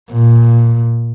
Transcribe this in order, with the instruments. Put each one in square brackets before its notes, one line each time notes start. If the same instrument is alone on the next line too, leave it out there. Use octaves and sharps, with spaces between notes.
[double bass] A#2